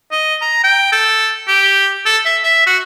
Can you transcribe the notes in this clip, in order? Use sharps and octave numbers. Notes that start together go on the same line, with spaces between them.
D#5
A#5
G5
A4
G4
A4
E5
E5
F#4